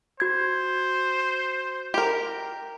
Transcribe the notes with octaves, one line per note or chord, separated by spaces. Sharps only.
F#4 C5 G#6
G4 A#4